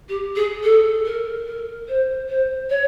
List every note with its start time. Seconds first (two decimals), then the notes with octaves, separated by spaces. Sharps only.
0.09 G4
0.36 G#4
0.63 A4
1.05 A#4
1.47 A#4
1.88 C5
2.29 C5
2.70 C#5